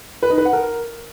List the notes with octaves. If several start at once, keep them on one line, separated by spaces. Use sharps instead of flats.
B4
D#4
B4
F#5
A#4